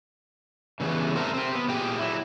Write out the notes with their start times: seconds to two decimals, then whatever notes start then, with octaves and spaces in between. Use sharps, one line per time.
0.80 C#3 E3 G3 B3
1.16 A3 C4 D4 A#4 C5
1.34 C4 G4
1.55 B3
1.68 A#2 G4 G#4 G5
1.99 F#3 E4